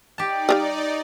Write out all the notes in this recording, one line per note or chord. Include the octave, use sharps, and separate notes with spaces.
D#4 G4 D5 A5
G3 G#4 F5